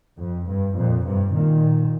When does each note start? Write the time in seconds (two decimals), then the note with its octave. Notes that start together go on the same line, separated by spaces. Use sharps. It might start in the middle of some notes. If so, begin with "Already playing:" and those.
0.17 F2
0.47 G2
0.75 F2 A#2
1.04 G2 C3
1.33 A#2 D#3